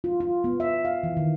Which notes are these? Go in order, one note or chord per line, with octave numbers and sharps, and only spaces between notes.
F4
F4
B3
E5
F5
E3
D#3